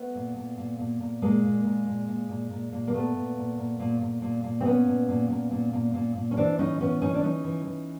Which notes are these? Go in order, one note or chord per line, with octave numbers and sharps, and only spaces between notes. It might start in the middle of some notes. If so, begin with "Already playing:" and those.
Already playing: A3 B3
A#2
A#2
A#2
A#2
A#2
A#2 G#3 A#3
A#2
A#2
A#2
A#2
A#2
A#2
A#2
A#3
A#2 A3 B3
A#2
A#2
A#2
A#2
A#2
A#2
A#2
C4
A#2 B3 C#4
A#2
A#2
A#2
A#2
A#2
A#2
A#2
C#4
E3 C4 D4
A2 C#4 D#4
E3 B3 C#4
E3 C#4 D#4
D4
E3 C#4 D#4
E3
E3